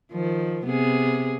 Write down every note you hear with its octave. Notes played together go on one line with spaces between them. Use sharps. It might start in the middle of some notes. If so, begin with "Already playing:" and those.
D#3 F3
C3 B3 G#4